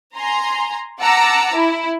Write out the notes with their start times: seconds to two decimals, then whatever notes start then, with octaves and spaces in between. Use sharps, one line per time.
0.17 G#5 A#5 C6
1.00 F#5 A5 A#5 D6 E6
1.54 E4